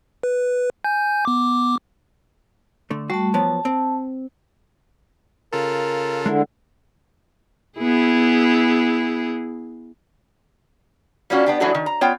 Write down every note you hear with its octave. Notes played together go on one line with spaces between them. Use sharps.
B4
G#5 G6
B3 D6
D3 A3
G3 A3 F#4 A5
F3 F#3 B3 A5
C4
C#3 F4 A4 A#4
D3 G#3 D4 E4
B3 E4 G#4
G3 A#3 C#4 D4 F4 F#4
B3 D4 G4
E3 F#3 G#3 A3 D4 F#4
D#3
A#5
B3 F4 C#5 G5